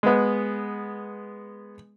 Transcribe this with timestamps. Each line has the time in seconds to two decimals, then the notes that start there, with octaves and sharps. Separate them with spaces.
0.03 G#3 B3